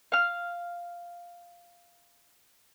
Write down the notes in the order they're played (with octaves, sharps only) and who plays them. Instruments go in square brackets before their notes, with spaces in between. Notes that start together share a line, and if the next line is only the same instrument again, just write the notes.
[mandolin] F5 F6